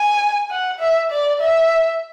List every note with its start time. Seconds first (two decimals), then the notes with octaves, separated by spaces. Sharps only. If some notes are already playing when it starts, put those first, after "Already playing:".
Already playing: G#5
0.50 F#5
0.79 E5
1.11 D5
1.41 E5